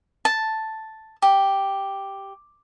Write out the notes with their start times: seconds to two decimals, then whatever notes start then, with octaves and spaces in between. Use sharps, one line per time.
0.25 A5
1.22 G4